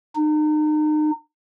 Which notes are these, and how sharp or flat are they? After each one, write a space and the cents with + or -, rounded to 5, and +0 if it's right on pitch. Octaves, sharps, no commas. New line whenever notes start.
D#4 -35